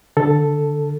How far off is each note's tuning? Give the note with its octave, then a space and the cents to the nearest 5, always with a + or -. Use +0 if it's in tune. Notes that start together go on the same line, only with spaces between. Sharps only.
D3 +0 A4 +0